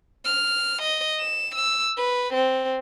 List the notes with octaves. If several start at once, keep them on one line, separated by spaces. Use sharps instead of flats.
F6
D#5
E7
E6
B4
C4